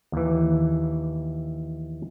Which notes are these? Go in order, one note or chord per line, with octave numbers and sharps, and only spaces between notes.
D#2 E3